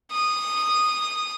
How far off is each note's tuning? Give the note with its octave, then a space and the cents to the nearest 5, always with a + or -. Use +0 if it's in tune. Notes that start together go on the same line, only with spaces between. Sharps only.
D#6 -10